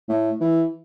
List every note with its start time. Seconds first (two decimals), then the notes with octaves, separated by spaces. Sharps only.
0.09 A2
0.41 E3